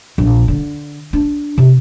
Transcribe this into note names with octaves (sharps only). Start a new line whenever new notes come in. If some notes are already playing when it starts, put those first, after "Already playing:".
A#1
D3
D4
C3